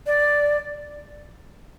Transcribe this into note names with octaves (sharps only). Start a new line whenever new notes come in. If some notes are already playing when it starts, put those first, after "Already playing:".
D5